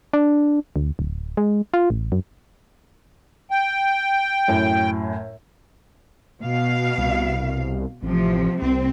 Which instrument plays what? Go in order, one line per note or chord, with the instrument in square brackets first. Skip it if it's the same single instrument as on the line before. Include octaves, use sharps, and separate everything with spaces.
[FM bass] D4
D2
D1
G#3
F4
A1
F#2
[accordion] G5
[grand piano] F#2 A2
[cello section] B2 F5
[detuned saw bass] C2
[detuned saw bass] A1 [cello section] C3 F3
[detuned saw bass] C2 [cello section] C4